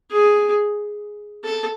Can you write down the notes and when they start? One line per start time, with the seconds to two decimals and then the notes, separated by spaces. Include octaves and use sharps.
0.11 G#4
1.44 A4